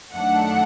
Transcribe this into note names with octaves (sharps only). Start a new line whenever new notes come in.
F#2 D#3 A3 D4 F#5